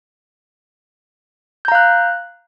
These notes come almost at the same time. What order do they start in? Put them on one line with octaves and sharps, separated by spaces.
G6 A#5 F5 F#6